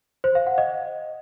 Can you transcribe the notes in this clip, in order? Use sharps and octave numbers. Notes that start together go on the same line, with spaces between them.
C5
F5
F#5
D#5